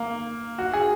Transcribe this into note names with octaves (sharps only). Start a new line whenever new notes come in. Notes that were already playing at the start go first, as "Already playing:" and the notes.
Already playing: A#3
F#4
G#4